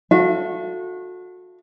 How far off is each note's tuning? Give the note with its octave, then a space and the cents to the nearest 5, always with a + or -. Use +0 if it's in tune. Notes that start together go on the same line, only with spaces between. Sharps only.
F#4 -30 A4 +0 E5 +45